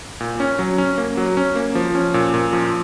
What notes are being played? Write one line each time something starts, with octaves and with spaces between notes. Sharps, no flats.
A#2
C#4
F#3
C#4
A#3
F#3
C#4
A#3
F3
C#4
A#2
A#2
F3